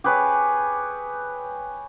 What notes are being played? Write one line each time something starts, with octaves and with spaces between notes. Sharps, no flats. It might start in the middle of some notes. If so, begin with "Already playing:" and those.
G4 G#4 B4 C#5